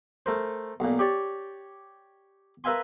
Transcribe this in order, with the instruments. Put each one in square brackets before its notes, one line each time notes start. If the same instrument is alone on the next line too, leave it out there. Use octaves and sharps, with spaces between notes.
[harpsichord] A3 A#4 C5
B1 A#2
G4 C#5 D5
A#4 B4 E5 F5 G#5 C6